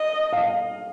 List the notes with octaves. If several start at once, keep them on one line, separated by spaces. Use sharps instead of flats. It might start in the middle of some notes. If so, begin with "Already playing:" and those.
Already playing: D#5
F5